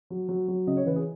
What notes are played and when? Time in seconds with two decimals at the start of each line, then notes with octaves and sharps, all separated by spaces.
0.10 F#3
0.29 F#3
0.48 F#3
0.67 C#3 D#5
0.77 C#5
0.86 E3 B4
0.96 G#4